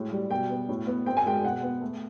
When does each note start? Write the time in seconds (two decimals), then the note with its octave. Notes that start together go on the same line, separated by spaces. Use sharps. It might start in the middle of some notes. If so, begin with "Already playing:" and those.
Already playing: A2 G#3
0.12 G3
0.31 B2 G5
0.50 B3
0.69 A2
0.87 B3
1.06 C4 G5
1.17 G#5
1.26 G#3 G5
1.44 B2 F#5
1.63 B3
1.81 A3